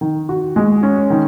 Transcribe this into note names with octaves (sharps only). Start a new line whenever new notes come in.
D#3
F#4
G#3
C#4
D#3